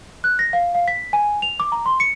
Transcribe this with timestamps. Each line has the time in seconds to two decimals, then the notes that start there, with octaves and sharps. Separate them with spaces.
0.24 F#6
0.39 A#6
0.53 F5
0.75 F5
0.88 B6
1.13 G#5
1.42 F7
1.60 D6
1.72 A#5
1.86 C6
2.00 C#7